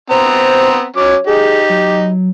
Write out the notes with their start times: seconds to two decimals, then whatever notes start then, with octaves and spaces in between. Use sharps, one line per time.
0.10 B3 C4 C5 A#5
0.96 F#3 C#4 C#5 D6
1.27 D#4 G4 G#4
1.70 F#3